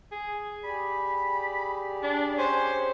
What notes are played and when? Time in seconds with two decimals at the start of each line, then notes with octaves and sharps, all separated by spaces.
0.12 G#4
0.64 G4 G#4 D5 B5
2.03 D4
2.37 C#4 C5